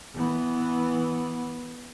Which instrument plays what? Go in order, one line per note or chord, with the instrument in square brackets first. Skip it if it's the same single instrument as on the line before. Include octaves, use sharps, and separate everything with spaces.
[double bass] E3 B3